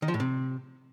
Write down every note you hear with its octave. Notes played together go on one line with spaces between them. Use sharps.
D#3
F3
A2
C3